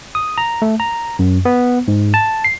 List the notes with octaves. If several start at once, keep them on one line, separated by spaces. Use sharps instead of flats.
D#6
A#5
A3
A#5
F#2
B3
G#2
A5
C7